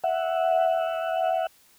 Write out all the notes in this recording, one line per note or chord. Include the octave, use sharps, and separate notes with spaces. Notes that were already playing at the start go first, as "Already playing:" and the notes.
E5 F#5